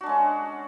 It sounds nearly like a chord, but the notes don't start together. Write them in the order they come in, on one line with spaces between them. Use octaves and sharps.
F#4 D4 G#3 C#4